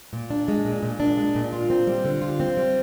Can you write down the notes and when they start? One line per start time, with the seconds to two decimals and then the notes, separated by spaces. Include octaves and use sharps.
0.13 A#2
0.30 D4
0.48 G#3
0.65 A#2
0.83 A#2
1.00 D4
1.17 G#3
1.35 A#2
1.53 F4
1.70 C4
1.87 G3
2.05 D3
2.22 F4
2.40 C4
2.57 G3